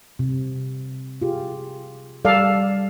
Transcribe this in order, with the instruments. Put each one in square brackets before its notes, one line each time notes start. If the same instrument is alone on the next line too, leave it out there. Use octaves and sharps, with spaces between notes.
[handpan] C3
F4 G4 G#4
[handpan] G3 [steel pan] A4 D5 F5